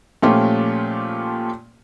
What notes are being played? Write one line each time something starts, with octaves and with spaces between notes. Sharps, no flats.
A#2 F3 A3 C#4 F4 G4